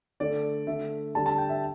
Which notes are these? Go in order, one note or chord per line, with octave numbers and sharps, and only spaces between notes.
D3 A3 D5
D3 A3 E5
D3 G3 A5
A5
G5
E5